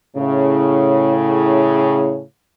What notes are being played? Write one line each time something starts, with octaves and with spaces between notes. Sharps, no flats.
A2 C#3